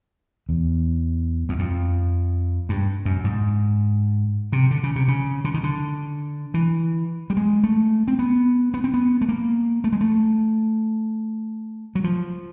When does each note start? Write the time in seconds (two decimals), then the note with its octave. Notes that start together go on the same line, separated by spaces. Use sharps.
0.49 E2
1.49 E2
1.59 F2
2.69 G2
3.05 F#2
3.24 G#2
4.52 C3
4.71 D3
4.83 C#3
4.96 C3
5.08 C#3
5.44 D3
5.54 D#3
5.63 D3
6.54 E3
7.30 G3
7.37 G#3
7.64 A3
8.08 C4
8.19 B3
8.74 B3
8.84 C4
8.94 B3
9.21 A3
9.29 A#3
9.84 A3
9.92 G#3
10.01 A3
11.95 F#3
12.04 F3